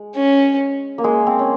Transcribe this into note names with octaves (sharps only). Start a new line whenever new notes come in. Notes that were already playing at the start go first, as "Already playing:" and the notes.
Already playing: G#3
C#4
A#3
G#3
C4
C#4